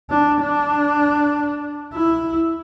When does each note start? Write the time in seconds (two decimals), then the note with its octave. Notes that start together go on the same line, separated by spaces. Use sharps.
0.10 D4
0.41 D4
1.93 E4